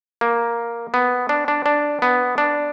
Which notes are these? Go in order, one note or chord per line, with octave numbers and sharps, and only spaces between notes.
A#3
B3
D4
D4
D4
B3
D4